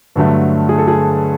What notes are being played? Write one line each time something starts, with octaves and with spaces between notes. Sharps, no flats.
G2 D3 F#3 A3
G#4
A4
G#4